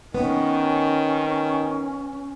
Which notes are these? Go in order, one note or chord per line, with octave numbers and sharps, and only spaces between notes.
D#3 B3 C#4